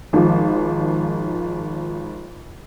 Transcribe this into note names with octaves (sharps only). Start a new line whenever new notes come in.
G#1 F3 G#3 D6